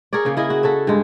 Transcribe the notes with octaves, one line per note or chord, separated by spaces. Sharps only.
G#4 A#4 C#5 D5
C#3 A#3 C#4
E4 G#4 D#5
F#4
F#4 A4 C#5 E5
G2 G#3